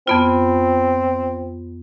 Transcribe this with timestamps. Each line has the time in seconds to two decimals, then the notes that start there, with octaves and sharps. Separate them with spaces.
0.07 F2 B3 C4 F4